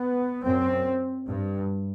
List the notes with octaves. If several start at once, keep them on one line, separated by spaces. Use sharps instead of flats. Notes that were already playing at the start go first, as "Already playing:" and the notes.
Already playing: B3
F#2 C4
G2